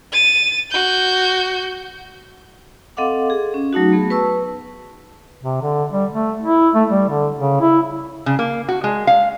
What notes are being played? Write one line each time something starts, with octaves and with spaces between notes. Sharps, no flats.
A6 D#7
F#4 G6
C4 A4 D#5 F5 F#5 D6
G#4
C#4
F#3 A3 D#4 F#4
A3 B3 G#4
B4 A5 C#6 E6
C3
D3
G3
A3
E4
A3
G3
D3
C#3
E4
C#3
A#3
F#4
G#3
F5